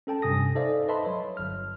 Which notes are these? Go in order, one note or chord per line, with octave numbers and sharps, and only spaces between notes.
C#4 A4 G5 A5
G2 C3 G#5 D#6 A#6
D#4 A4 C5 D5 E5 F5
B4 D#5 E5 A5 B5 C6
F#3 C#5
G1 F6